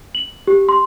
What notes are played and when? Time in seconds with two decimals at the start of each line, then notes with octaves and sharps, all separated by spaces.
0.15 F#7
0.47 G4
0.69 C6